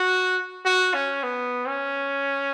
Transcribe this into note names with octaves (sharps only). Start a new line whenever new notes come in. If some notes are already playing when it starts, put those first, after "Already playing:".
Already playing: F#4
F#4
C#4
B3
C#4